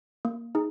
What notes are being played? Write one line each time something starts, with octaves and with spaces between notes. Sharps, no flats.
A#3
D#4 G#4